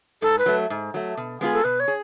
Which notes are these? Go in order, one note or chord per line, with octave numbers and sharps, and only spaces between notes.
G#2 A4
B4
F#3 A3
G#2
F#3 A3
B2
G#3 B3 F4 G#4
A4
B2 B4
C#5
G#4